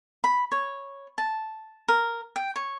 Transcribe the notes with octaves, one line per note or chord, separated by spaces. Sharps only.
B5
C#5
A5
A#4
G5
C#5